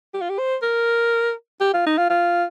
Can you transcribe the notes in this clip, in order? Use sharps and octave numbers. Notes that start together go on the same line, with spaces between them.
G4
F4
G4
C5
A#4
G4
F4
D#4
F4
F4